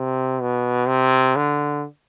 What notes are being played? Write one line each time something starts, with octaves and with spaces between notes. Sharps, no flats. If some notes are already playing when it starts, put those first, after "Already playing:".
Already playing: C3
B2
C3
D3